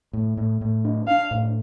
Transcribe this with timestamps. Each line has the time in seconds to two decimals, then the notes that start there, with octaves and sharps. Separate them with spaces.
0.13 A2
0.37 A2
0.61 A2
0.85 D4
1.07 D4 F5
1.31 A2